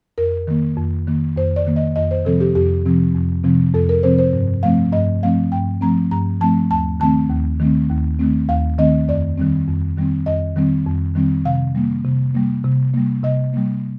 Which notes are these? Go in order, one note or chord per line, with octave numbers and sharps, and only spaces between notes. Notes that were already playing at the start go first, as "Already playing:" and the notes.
F2 A#4
D#3 A#3
F2
D#3 A#3
F2 C5
D5
D#3 A#3
D#5
F2 D#5
C5
C3 F3 C4 A4
G4
F2 G4
C3 F3 C4
F2
C3 F3 C4
F2 A4
A#4
C3 F3 C4 C5
C5
G2
F3 A3 C4 F5
G2 D#5
F3 A3 C4 F5
G2 G5
F3 A3 C4 A#5
G2 A#5
F3 A3 C4 A5
D#2 A5
D#3 A3 C4 A5
D#2
D#3 A3 C4
D#2
D#3 A3 C4
D#2 F5
D#3 A3 C4 D#5
F2 D5
D#3 G3 C4
F2
D#3 G3 C4
F2 D#5
D#3 G3 C4
F2
D#3 G3 C4
C3 F5
G3 A#3
C3
G3 A#3
C3
G3 A#3
C3 D#5
G3 A#3